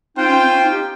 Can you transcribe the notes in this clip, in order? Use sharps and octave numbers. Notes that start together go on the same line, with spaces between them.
C4 D#4 F4 C5 G5
C#4
C4
C#4
C4 D#4
D#4 G4